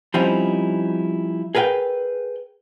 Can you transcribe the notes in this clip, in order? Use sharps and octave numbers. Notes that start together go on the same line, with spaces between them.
F3 G3 C4 C#4 D#4 E4
G#4 A#4 B4 F5 G5